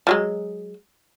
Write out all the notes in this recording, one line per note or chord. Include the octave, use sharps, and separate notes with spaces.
F3 F#3 G#3